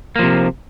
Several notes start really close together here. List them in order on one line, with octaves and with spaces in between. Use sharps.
A#3 F3 C3